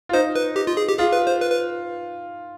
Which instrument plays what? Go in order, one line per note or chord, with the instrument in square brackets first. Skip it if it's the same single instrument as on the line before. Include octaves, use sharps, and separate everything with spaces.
[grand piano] F4
[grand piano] D#4 [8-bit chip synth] C5
[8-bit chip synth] B4
G4
F4
G#4
G4
[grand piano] F4 [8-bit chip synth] G#4
[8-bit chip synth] B4
C5
B4
B4